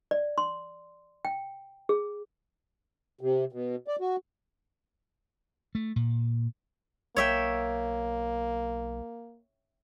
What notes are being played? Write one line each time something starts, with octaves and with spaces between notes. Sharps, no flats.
D5
C6
G5
G#4
C3
B2
D5
F#4
A3
A#2
B1 A#3 C#5 E5 G5